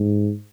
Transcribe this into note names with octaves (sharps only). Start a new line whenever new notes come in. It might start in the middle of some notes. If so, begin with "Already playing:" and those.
Already playing: G#2